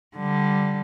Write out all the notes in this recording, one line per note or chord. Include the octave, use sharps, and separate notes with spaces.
D3 G3